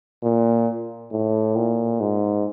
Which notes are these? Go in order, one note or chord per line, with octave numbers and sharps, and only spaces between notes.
A#2
A2
A#2
G#2